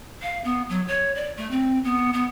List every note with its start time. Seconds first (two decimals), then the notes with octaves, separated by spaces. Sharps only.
0.22 F5
0.44 B3
0.69 F#3
0.88 C#5
1.15 D5
1.37 A3
1.51 C4
1.84 B3
2.13 B3